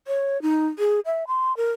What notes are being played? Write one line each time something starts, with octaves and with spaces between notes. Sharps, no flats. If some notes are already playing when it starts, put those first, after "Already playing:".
C#5
D#4
G#4
E5
C6
A#4